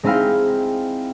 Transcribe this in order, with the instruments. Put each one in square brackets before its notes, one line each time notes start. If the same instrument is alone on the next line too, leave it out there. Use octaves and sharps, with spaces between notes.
[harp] G#3 C4 D#4 E4 F5 G5